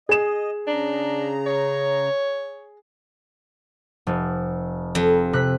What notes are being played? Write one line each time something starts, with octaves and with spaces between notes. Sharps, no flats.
G#4 D#5 E7
C#3 D4 A#5
C#5
F1
F2
C3 F#6 B6